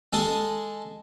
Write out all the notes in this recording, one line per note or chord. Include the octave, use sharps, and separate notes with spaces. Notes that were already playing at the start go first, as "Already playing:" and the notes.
G#3 G#4 A4 D#6